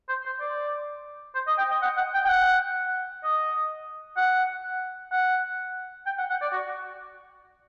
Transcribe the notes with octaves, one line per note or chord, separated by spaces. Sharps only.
C5
C5
D5
C5
D#5
G5
D#5
F#5
F#5
G5
G5
F#5
D#5
F#5
F#5
G5
F#5
F#5
D5
F#4